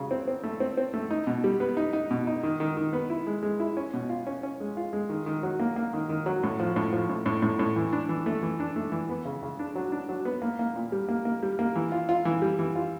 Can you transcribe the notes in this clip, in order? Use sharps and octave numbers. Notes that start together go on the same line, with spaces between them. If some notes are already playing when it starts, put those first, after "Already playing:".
Already playing: C#3 F#3
C4
C4
A3
C4
C4
A3
D#4
B2
G3
B3
D#4
D#4
B2
D#4
D#3
D#3
D#3
B3
E4
G#3
G#3
E4
C#4
B2
F4
C#4
C#4
G#3
F4
G#3
D#3
D#3
F#3
A#3
A#3
D#3
D#3
F#3
A2
F3
A2
F3
A2
A2
A2
A2
E3
D4
E3
A3
E3
D4
A3
E3
B3
C#3
C#3
D4
F#3
D4
F#3
B3
A#3
A#3
A#2
G3
A#3
A#3
G3
A#3
E3
F4
F4
E3
G3
E3
F4